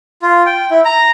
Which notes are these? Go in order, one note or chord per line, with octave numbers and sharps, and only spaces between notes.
F4
G5
E4
A#5